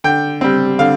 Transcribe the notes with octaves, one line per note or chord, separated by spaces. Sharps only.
D3 G5
G3 C4
D3 F5